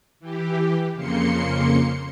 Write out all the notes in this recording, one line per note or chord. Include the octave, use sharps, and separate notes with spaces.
E3 G4
F2 C#3 A#3 C6 C#7